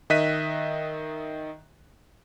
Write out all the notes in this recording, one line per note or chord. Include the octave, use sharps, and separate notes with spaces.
D#3 D#5 E5 F#6 B6 D#7